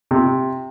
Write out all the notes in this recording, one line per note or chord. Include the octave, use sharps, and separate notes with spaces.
C3